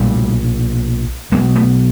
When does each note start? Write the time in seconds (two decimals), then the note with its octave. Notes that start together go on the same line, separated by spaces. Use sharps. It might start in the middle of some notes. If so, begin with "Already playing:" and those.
Already playing: B1 A#2 G3 A3
1.32 B1 B2 G#3 A#3
1.55 A3 B3